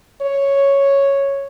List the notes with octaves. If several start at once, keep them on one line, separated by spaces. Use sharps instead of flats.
C#5